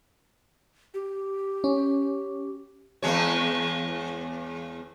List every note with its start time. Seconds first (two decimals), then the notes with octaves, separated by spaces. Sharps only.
0.94 G4
1.64 C#4
3.03 E2 G#3 C#5